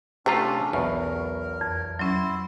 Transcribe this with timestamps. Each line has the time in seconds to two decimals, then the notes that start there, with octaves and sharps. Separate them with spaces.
0.26 C3 A3 C#4 D4 F4 G4 G#4 A#5
0.73 B1 E2 B2 A#4 C#6
1.61 F2
1.99 F#3 C#4 E4 C6